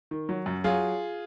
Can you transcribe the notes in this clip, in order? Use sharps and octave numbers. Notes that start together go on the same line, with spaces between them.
D#3
F#3
F#2
F#3 F4 G#4